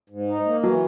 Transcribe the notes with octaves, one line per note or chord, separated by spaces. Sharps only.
G#2
D#4
A#3
E3 F#3